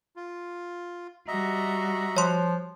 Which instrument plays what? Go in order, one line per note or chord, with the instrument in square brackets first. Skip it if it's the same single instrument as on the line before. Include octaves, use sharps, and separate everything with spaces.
[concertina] F4
[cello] G3 F#4 [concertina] D#5 E5 A#5
[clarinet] F3 [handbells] C#5 C6